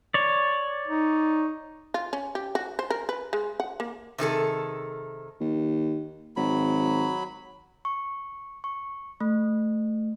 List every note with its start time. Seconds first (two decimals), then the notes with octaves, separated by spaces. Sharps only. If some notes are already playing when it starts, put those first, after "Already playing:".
0.14 C#5 D5
0.88 D#4
1.94 F4
2.13 C#4
2.35 G4
2.55 F#4
2.79 C5
2.90 A#4
3.09 B4
3.33 G#3
3.60 F#5
3.80 A#3
4.18 C3 D#3 G#4 A4
5.40 D#2
6.36 G#1 F#3 B5
7.85 C#6
8.64 C#6
9.20 A3